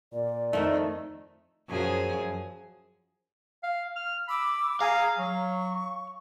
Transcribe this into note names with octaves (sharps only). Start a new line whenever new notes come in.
A#2 D5
F2 D#3 A3 D#4
F#2 F3 G#4
F5
F6
B5 D6 E6
G#4 F5 G#5 A#5 F6
F#3 C#6